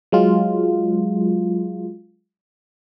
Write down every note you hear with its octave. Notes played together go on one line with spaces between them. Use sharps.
F#3 G#3 F4